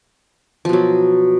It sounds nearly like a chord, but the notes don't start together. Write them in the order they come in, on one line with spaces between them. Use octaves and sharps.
F3 B2 F#3